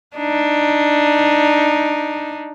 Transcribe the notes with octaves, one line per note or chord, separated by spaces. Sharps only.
D4 D#4